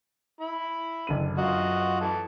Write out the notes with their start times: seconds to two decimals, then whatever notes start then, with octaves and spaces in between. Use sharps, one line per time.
0.40 E4 B5
1.07 F#1 D3 D#7
1.38 F#2 F4 F#4 D#5
2.01 E3 A4